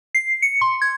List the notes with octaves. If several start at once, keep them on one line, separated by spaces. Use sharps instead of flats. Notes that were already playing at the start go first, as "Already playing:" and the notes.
C7
C#7
C6
G#6